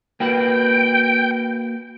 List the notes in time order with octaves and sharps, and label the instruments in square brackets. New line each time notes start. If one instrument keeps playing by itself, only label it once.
[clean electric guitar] A#3 F#4 B4 [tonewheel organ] G5